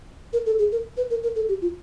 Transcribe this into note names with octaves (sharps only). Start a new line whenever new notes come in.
A#4
A4
G#4
A#4
B4
A#4
A#4
A4
G4
F4